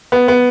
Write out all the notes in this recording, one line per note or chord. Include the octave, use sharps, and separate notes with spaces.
B3
B3